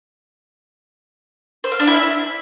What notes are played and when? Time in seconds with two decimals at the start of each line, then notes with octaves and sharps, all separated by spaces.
1.64 C5
1.72 F5
1.79 D4
1.87 E4
1.95 E5